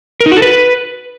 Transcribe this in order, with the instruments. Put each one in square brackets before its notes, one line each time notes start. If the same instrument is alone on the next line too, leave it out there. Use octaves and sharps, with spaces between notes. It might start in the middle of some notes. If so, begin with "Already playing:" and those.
[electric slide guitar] A#4
D#4
F#4
A4
B4